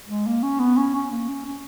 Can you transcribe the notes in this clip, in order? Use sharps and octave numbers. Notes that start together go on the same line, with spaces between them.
G#3
A#3
C#4
B3
C#4
C#4
A#3
C#4
C#4